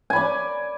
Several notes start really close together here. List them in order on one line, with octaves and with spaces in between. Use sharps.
G#5 B5 D5